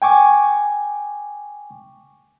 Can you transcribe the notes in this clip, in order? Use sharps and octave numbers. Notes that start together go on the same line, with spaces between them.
G5 G#5 C#6 D6